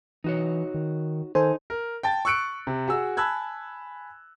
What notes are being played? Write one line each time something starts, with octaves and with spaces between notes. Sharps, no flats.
E3 D#4 F#4 C#5
D#3
D#3 D#4 A4 C5 G#5
A#4
G5 A5 A6
C#6 E6 F#6 C#7 D7
C3
F#4 G#4 E6
G#5 A5 B5 E6 F#6 G#6